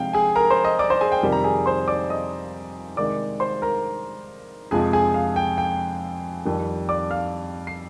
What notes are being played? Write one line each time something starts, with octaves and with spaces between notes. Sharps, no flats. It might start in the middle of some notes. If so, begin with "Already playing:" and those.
Already playing: C3 F3 G#3 F5 G5
G#4 G#5
A#4 A#5
C5 C6
D#5 D#6
D5 D6
C5 C6
G#4 G#5
G5
F2 C3 D#3 G3
A#5
G#4 G#5
C5 C6
D5 D6
D#5 D#6
C3 D#3 G#3 D5 D6
C5 C6
A#4 A#5
F2 C3 F3 G#3 G#4 G#5
G#4 G#5
F5
G5
G5
F2 D#3 G3
D5 D6
F5 F6
C7